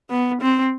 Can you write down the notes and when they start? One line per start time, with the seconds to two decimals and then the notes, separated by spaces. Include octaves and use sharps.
0.10 B3
0.41 C4